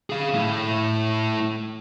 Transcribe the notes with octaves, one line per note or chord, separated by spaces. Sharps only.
G#4 F5
A3 E4